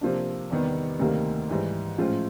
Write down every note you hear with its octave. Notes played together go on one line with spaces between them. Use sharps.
C3 F3 A#3 D4
E2 C3 D#3 G3 B3
D2 C3 D#3 G3 A#3
G#2 E3 G3
A2 F3 G#3 C#4 F4